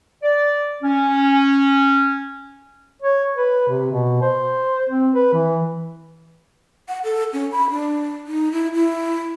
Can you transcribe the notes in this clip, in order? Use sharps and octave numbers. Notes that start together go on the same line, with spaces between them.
D5
C#4
C#5
B4
C3
B2
C5
C4
B4
E3
F#5
A4
C#4
B5
D4
D#4
E4
E4